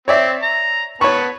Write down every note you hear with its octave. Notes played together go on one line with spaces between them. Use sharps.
C4 C#5 D5 E5
A#5
B3 B4 C#5 A5 C#6